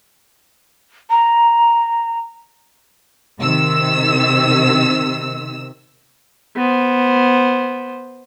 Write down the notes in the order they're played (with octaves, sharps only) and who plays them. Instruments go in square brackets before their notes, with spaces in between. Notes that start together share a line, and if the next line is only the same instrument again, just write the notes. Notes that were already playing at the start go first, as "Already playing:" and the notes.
[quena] A#5
[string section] C3 D#3 E6
[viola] B3 C5